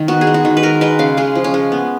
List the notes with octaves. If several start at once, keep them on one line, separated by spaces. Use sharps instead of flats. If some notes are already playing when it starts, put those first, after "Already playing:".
Already playing: D#3
B3 F#4
G#4
G#3
F#4
D#3
B4
G#3 A#4
G#3 B4
C#3 F5
G#3 G#4
F3
C#4
G#3
B3